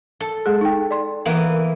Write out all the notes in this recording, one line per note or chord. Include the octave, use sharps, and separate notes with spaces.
A4
G#3 G#4
D#4 G5
D5 C6
E3 A#3 B3